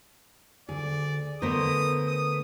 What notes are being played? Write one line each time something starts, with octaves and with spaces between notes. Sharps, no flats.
D2 G#4 D5
D3 A3 B3 A#4 C5 D#6
D#6